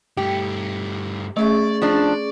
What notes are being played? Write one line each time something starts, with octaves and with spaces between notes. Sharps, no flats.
G2 A3 G4
A3 C#4 G#4 D5 E5 C#6
F3 D4